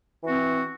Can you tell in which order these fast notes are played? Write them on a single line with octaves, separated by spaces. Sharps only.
E3 F#4 C4